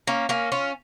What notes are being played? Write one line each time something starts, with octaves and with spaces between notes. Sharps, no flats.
A#3 C#4
A#3 C#4
C#4 F4